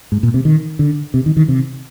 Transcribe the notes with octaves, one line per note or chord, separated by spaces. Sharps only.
G#2
A#2
C3
D#3
D3
C3
D#3
D#3
C3